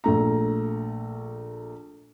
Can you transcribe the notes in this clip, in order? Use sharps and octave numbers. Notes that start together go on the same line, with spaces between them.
A#1 A3 A#5